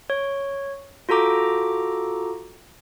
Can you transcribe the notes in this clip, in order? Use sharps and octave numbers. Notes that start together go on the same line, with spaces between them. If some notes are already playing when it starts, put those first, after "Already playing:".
C#5
F4 F#4 A4 A#5 D6